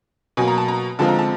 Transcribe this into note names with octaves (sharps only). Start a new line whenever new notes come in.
B2 F#3 A#3 G#5
A#5
A5
A#5
D3 F3 G#3 C4 F4 A5
A#5
A5